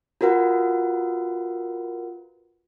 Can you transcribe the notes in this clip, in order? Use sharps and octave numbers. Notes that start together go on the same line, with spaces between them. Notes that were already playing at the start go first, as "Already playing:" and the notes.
F4 F#4 A#4 B4 F#5